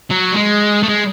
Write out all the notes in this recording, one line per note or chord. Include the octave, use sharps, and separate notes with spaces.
F#3
G3
G#3
A3
G#3